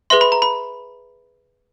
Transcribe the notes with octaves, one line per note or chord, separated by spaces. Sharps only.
G#4 B4 E5 C6
B5
A#5
B5